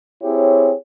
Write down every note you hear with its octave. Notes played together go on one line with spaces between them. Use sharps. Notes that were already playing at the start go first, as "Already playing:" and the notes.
C4 E4 G4 G#4 C#5